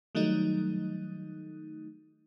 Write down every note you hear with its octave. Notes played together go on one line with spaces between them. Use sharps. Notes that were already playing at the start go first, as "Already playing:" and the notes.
D#3 F#3 G3 A3 D#4